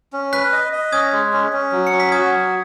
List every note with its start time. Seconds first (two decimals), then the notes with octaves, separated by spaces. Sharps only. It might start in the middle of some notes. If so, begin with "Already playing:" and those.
0.13 C#4
0.33 B4 F#6 B6
0.53 D#5
0.73 D#5
0.92 C#4 D#6 G#6
1.13 G#3
1.33 C#4
1.53 C#4
1.72 F#3
1.87 C#7
1.93 C#4
2.00 B6
2.12 F#4 D#6 G#6
2.32 F#3